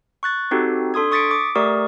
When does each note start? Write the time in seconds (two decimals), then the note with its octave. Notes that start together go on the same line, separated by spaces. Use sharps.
0.23 C#6 F#6 A6
0.51 C4 D#4 F#4 G4 A4
0.94 D4 A4 C6 D#6 G#6
1.11 C#6 D#6 A6 B6 C#7 D7
1.31 D6
1.55 A3 G4 A#4 D5 C#6 D#6